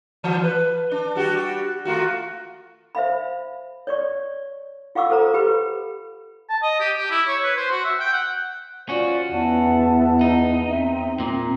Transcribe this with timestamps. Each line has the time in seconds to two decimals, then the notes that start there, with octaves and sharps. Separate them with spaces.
0.24 E3
0.44 B4
0.91 D4
1.15 G3 F#4 G4
1.85 A3 F4 F#4
2.95 C5 E5 F5 B5
3.87 C#5 D5 C#6
4.95 F4 F5 F#5 C#6 D6 E6
5.10 A4 C5 A#5
5.34 G4 B4 B5
6.49 A5
6.62 D#5
6.80 G4
6.97 G4
7.11 E4
7.27 C#5
7.43 B4
7.57 C5
7.71 F#4
7.84 E5
8.00 G5
8.12 F#5
8.89 C#4 F4 F#4 C5 D5
9.33 E2 B3 E4 F#5 A5
10.21 D#4
10.68 C4 E5
11.20 A#2 A#5